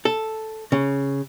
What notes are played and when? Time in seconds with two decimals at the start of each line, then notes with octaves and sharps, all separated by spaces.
0.05 A4
0.72 C#3